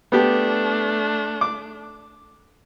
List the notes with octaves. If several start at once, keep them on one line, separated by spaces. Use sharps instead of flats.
A3 B3 D4 G4
D6